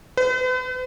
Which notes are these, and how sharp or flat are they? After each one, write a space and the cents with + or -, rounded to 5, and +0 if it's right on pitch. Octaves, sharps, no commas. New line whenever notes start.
B4 +45